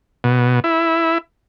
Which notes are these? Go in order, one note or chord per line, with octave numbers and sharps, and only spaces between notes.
B2
E4